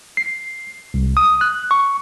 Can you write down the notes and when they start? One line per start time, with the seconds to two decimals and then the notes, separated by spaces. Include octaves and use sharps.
0.17 C7
0.94 C2
1.17 D#6
1.41 F#6
1.71 C#6